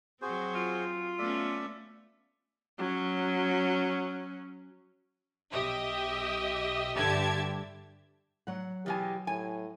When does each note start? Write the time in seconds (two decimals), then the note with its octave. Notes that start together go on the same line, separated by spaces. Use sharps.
0.22 F#3 C4 F#4 G#4 C5
0.55 F4
1.18 A3 B3 C#4 A4 D5 E5
2.79 F#3 C#4
5.51 B1 G4 D#5 E5
6.95 G2 D3 G4 E5 A5 G#6
8.47 F#3 F#5
8.86 E2 B2 G4 G#5
9.27 A2 G#5